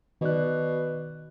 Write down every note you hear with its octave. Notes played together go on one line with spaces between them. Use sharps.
B2 D#3 D5 F#6